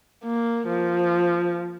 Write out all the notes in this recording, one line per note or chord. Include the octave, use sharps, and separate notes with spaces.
A#3
F3